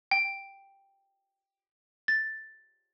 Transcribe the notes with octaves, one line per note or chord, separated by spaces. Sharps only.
G5
A6